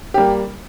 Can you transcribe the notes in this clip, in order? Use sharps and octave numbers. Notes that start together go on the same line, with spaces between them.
G3 A#3 G4